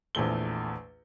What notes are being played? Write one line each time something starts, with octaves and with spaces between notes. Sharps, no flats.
A#1 E2 A3 G7